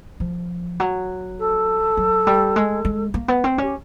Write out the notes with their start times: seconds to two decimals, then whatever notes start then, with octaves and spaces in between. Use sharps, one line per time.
0.20 F3
0.80 F#3
1.39 A4
1.97 F#3
2.27 G3
2.56 G#3
2.85 G#3
3.14 A#3
3.28 B3
3.44 C4
3.58 C#4 G4